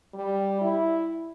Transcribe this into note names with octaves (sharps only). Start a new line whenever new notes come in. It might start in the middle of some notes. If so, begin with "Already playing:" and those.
G3
E4